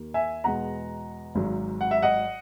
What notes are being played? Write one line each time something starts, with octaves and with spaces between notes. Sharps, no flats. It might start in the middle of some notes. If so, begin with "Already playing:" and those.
Already playing: D#2 D#3 A#3
E5 G#5
E2 B2 G#3 F#5 A#5
G#1 G#2 F#3
F#5
E5
D#5 F#5